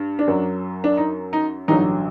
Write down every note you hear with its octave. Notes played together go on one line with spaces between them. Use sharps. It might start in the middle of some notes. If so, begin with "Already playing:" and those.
Already playing: G2
D4
F#2 F#3
D4
D#4
D#4
A1 G2 D3 F#3 D#4